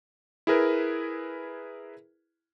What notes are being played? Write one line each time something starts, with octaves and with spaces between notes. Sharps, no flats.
E4 G#4 A#4 B4